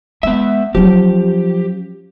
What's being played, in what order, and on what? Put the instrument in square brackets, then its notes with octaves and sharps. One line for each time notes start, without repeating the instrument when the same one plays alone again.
[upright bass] G#3 [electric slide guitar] B3 E5
[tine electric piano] F3 [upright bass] F#3 C#4 [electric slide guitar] G4